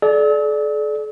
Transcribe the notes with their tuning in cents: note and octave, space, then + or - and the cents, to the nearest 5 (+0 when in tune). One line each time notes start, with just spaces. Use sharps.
A4 -45 D5 +0